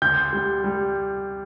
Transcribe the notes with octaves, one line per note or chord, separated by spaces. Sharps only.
D2 G6
G3
G3